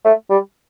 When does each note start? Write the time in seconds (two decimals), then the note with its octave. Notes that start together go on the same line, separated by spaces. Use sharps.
0.05 A3
0.30 G3